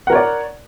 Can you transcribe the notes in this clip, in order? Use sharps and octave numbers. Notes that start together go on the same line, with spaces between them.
A#4 C#5 D5 F#5